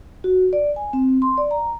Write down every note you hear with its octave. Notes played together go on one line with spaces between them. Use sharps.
F#4
D5
G#5
C4
C6
D5
A#5